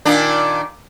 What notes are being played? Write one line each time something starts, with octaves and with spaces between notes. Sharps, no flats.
A#2 D#3 D4